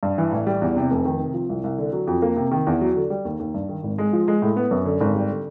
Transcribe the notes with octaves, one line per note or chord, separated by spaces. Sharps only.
G2
E3
A1
G3
E2
C3
F1
D#3
C3
F3
C2
C2
D3
F#3
F2
A#3
C3
D#3
E2
F#3
D3
G3
D#2
D#2
G2
D#3
G#1
G#3
F3
G#3
A2
B3
F#2
D3
G#1
G3
D3